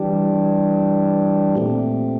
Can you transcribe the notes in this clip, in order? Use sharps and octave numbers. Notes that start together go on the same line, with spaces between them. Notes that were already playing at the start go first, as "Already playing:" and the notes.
Already playing: E3 G3 D4 G4
A#2 A3 C4